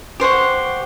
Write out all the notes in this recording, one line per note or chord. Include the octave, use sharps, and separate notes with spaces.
G4 C5 F#5 C#6